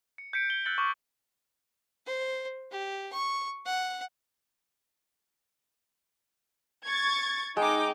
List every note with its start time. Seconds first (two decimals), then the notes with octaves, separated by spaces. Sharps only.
0.18 C#7
0.33 G6 B6 C#7 D7
0.50 G7
0.65 E6 F#6 G6 A6 C#7 F#7
0.78 C#6 D6 A6
2.06 C5
2.72 G4
3.13 C#6
3.66 F#5
6.86 C#6 G#6 A6
7.57 G#3 D#4 G5 D6